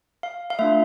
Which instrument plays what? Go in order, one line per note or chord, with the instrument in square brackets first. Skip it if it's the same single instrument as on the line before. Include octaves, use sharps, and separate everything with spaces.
[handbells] F5
F5
A3 D4 F4 E5